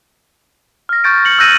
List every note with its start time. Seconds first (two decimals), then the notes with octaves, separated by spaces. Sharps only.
0.89 F6 A#6
1.04 C#6 G6 A6 D7
1.25 C#7 F#7
1.39 E6 F#6 G6 A#6 D#7